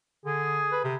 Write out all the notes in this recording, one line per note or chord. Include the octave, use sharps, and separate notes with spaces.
D3 G#4
B4
C3